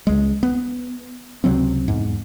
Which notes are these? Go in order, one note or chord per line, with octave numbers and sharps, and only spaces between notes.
C#2 G#3
B3
C#2 C3 F#3 C4
E2 G#2